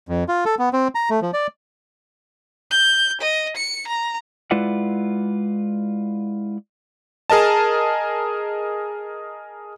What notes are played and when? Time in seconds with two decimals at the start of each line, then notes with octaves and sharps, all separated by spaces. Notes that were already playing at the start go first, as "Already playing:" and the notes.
0.09 F2
0.28 F4
0.45 A4
0.59 B3
0.73 C4
0.95 A#5
1.10 A3
1.22 F3
1.33 D5
2.71 G6
3.21 D#5
3.57 C#7
3.87 A#5
4.51 G#3 E4 F4 B4 D5 F#5
7.30 G#4 A#4 D#5 A5